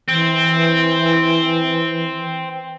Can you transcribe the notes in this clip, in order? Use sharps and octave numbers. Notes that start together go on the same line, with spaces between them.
E3 C4